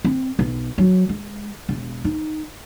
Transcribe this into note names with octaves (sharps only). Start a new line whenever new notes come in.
C4
B1
F#3
G#3
E1
D#4